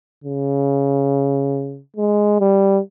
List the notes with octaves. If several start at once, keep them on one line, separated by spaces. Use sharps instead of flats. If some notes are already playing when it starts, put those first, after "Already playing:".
C#3
G#3
G3